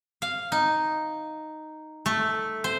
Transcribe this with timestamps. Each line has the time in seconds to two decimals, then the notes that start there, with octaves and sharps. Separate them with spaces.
0.22 F5
0.52 D#4
2.06 A3
2.64 C5